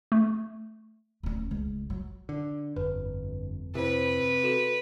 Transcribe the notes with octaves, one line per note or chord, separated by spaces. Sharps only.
A3
D1 C#4
C#2
F#3
D3
G1 F2 B4
C3 E4 B4 C5
F#4 A4 E7